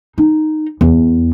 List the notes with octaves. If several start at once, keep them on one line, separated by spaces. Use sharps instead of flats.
D#4
E2